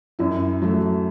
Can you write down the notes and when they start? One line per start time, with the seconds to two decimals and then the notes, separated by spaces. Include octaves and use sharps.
0.19 F#2 E4
0.62 F#3 A3